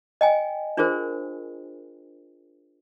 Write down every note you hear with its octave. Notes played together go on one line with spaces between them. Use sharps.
D#5 G5 G#5
D4 F4 G#4 A#4 C5